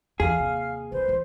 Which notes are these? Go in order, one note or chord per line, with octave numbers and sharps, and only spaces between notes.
E2 G#4 F5 F6
D#2 C3
C2 B4 C5
E3 F4